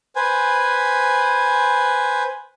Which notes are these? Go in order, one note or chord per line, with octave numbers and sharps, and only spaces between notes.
B4 C5 G#5